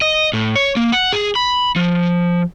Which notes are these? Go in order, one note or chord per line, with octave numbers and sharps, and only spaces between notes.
D#5
A2
C#5
A#3
F#5
G#4
B5
F3